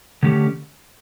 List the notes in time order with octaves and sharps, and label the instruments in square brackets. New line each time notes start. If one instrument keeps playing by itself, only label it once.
[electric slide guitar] D3 A3 C#4 G4